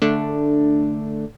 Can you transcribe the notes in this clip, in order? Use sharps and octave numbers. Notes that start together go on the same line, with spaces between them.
D3 A3 D4